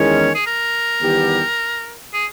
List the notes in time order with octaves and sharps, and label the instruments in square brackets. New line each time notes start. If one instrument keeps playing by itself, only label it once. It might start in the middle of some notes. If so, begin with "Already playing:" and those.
Already playing: [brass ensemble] E2 D#3 G#3 C#4 [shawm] C#5
[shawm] G#4
A#4
[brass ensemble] E2 D#3 G3 B3 G4
[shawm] G#4